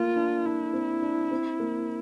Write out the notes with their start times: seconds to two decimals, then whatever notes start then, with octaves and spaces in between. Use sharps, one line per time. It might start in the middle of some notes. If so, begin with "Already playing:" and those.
Already playing: A3 A#3 F4
0.16 D4
0.45 D4 E4
0.73 C4
1.02 D4
1.31 C4
1.60 A#3